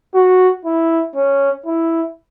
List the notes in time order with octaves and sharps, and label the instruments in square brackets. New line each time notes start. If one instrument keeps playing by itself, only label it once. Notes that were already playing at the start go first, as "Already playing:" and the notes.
[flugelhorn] F#4
E4
C#4
E4